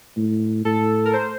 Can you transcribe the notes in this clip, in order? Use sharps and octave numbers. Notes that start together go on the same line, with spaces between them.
A2
A2 A4
A#4
C5